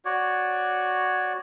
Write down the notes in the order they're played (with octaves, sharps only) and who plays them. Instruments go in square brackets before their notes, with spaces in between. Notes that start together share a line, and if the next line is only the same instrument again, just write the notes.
[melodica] F#4 C#5 D5